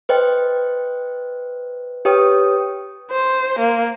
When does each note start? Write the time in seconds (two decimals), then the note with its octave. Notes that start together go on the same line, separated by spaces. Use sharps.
0.09 B4 C5 D#5 G5
2.05 G4 B4 C#5 G5 D#6
3.11 C5
3.59 A#3